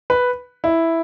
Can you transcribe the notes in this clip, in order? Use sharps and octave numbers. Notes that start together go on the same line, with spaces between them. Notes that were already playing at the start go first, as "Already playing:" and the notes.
B4
E4